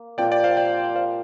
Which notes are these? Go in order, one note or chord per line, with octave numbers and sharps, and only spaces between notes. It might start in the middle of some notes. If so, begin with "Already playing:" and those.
Already playing: A#3
A#2 F3 C4 G4 D5 G5
D5 G5
C5 F5
D5 G5
C5 F5